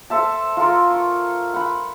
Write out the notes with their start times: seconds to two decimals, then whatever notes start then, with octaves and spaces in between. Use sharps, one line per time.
0.10 A4 C5 E5 A5
0.57 F4 A4 A#4
0.91 C#6
1.54 F#5 B5